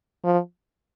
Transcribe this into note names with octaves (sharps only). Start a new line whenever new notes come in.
F3